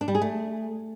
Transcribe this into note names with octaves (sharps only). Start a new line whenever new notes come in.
D4
G3
G#4
A3